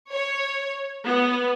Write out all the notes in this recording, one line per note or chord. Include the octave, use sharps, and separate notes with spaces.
C#5
B3